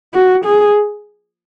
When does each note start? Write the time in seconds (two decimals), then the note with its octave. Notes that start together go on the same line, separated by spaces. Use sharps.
0.14 F#4
0.45 G#4